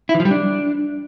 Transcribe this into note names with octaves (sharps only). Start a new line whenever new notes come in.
E4
E3
F3
G3
D4